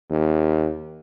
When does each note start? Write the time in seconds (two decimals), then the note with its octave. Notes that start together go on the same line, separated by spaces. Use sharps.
0.10 D#2